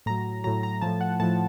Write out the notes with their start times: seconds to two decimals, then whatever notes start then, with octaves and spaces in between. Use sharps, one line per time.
0.06 A2 F#3 A#5
0.44 A2 F#3 A#5
0.63 A#5
0.81 A2 F3 A5
1.01 F#5
1.20 A2 F3 A5